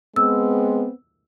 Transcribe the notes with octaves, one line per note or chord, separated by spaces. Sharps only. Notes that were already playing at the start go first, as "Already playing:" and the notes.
G#3 B3 C4 E6